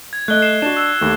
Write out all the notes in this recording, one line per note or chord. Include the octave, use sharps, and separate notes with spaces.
G#6
A3 D#5 F#6 G7
C7 E7
D4 F#4 E7
E6 E7
D#2 A3